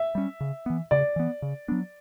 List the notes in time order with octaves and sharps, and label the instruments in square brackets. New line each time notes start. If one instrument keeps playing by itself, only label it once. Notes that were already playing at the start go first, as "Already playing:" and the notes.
Already playing: [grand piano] E5
[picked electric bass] G3 C#4
C#3
E3 B3
[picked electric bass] C#3 [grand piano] D5
[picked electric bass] E3 B3
C#3
F#3 B3 D4